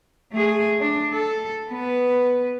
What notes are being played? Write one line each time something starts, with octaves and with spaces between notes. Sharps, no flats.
A3 G#4
D4
A4
B3 B4